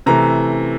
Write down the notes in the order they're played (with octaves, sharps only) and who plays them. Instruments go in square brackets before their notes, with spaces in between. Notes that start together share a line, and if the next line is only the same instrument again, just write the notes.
[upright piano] C3 E3 A3 A#5